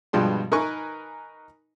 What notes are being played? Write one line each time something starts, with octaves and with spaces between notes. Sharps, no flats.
G2 B2 F3 G3 G#3 C6
D#4 A#4 B4 G#5 C#6